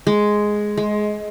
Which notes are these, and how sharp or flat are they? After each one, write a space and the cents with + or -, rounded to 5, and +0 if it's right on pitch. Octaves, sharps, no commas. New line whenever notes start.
G#3 +5
G#3 +20